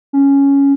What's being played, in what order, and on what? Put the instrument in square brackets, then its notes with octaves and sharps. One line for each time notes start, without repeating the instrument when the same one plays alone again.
[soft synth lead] C#4